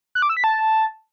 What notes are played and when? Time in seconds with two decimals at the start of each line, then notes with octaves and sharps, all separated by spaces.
0.15 F#6
0.22 D6
0.30 E6
0.37 B6
0.44 A5